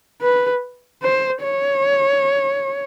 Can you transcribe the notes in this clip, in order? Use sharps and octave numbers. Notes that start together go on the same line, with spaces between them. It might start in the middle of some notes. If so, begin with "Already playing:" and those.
B4
C5
C#5